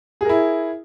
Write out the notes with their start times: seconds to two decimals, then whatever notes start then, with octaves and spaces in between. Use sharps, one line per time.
0.21 G#4
0.25 A#4
0.29 E4